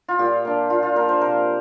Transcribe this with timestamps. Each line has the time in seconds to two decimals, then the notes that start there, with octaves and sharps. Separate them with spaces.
0.08 F4
0.19 A#2 G4
0.45 A#3 D4
0.70 A#2 F4
0.83 F4
0.96 A#3 D4 A#4
1.09 C5
1.21 C3 A#4